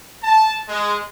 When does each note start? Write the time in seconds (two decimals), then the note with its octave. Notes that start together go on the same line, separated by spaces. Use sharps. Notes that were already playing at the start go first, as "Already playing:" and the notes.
0.23 A5
0.69 G#3